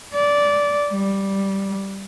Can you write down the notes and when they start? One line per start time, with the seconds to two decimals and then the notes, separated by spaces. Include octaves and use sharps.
0.15 D5
0.92 G3